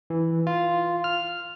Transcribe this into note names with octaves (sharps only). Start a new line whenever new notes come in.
E3
F4
F6